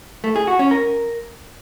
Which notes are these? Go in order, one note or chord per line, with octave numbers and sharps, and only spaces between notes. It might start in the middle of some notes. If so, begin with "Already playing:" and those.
A3
G#4
F#4
C#4
A#4